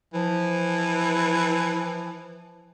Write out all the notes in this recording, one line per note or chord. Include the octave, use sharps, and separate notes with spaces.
E3 F3